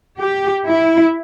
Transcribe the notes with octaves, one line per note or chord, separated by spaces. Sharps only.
G4
E4